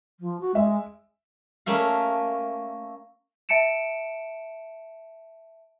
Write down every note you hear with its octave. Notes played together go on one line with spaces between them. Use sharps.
F3
F#4
G#3 E5
A3 A#3 C#4 F5
E5 A5 C#7 D7 E7